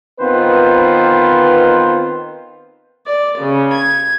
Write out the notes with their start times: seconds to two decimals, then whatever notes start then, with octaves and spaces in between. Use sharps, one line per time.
0.20 D#3 B3 C4 F4 B4 C5
3.06 D5
3.38 C#3
3.74 G#6